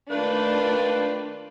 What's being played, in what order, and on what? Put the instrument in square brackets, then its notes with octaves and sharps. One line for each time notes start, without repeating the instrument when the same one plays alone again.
[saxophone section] D#3 A#3 B4 [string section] A3 D4 F4